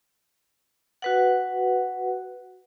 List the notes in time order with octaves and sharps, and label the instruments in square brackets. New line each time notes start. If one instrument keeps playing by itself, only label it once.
[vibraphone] F#4 B4 F#5